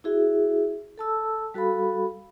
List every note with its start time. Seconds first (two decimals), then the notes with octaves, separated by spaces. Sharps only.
0.04 E4 F#4 G#4 E5
0.98 A4 A5 E6
1.54 G3 F#4 A4 F5 B5